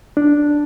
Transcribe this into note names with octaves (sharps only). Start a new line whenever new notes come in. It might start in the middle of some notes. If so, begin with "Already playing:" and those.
D4